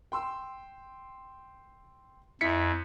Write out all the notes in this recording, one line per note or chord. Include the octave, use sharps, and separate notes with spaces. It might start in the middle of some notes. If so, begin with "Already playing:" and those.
G5 C6 E6
F2 E4 B6 C#7